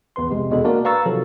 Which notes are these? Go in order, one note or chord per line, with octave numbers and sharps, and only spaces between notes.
A#1 E2 B4 C6
F2 C3 G#3
E2 B2 G#3 D4 A4
A#3 D4 F#4 A#4 D5
B4 F5 A#5 C#6 E6 A6
C3 D#3 F3 F#3 A4